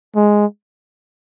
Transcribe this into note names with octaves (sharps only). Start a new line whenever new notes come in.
G#3